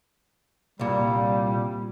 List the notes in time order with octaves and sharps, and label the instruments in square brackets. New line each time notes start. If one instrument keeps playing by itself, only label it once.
[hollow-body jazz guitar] C2 A#2 [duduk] G3